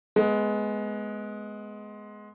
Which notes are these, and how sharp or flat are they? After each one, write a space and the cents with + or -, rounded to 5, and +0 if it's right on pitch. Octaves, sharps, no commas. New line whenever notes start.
G#3 +15 B3 +0